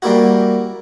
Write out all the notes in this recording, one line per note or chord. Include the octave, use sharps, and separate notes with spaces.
G3 A#3 E4 F#4